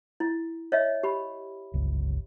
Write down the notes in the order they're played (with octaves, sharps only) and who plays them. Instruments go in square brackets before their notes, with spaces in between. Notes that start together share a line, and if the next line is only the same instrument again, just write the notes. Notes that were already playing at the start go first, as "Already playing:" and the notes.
[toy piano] E4
C#5 D#5 E5
G4 B5
[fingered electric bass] G1 C#2